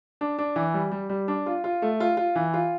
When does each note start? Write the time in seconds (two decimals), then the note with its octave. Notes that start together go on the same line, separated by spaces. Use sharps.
0.21 D4
0.39 D4
0.56 E3
0.74 G3
0.92 G3
1.09 G3
1.28 D4
1.46 F4
1.64 F4
1.82 A3
2.00 F4
2.17 F4
2.35 E3
2.54 F4